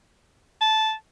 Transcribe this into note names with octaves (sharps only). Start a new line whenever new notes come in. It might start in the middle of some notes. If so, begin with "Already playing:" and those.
A5